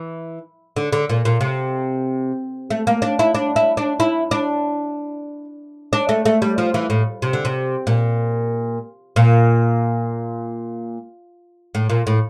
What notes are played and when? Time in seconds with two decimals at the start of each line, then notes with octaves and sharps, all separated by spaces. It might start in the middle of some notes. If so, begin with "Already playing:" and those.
Already playing: E3
0.76 D3
0.93 D3
1.09 A#2
1.25 A#2
1.41 C3
2.70 A3
2.87 A#3
3.02 D4
3.19 E4
3.35 D4
3.56 E4
3.77 D4
4.00 E4
4.31 D4
5.93 D4
6.09 A3
6.26 A3
6.42 G3
6.58 F3
6.74 E3
6.90 A2
7.22 C3
7.33 D3
7.45 C3
7.87 A#2
9.16 A#2
11.75 A2
11.90 A#2
12.07 A2